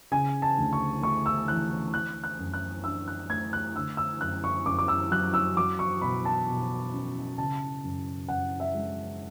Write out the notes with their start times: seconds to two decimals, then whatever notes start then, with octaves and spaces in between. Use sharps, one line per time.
0.11 C#3 G#5
0.42 A5
0.58 D2
0.73 C#6
1.02 A3 C#6
1.26 E6
1.48 E3 F#6
1.93 E3 F#6
2.24 F#6
2.39 F#2
2.54 F#6
2.84 D4 E6
3.08 F#6
3.29 A3 G#6
3.53 F#6
3.76 D3 E6
3.97 E6
4.21 F#2 F#6
4.44 C#6
4.65 F#2 D6
4.78 D6
4.88 E6
5.11 F#3 F#6
5.34 E6
5.56 F#3 D6
5.79 C#6
6.02 B2 B5
6.25 A5
6.48 B2
6.93 C#4
7.38 C#3 A5
7.84 F#2
8.28 F#2 F#5
8.60 E5
8.75 G#3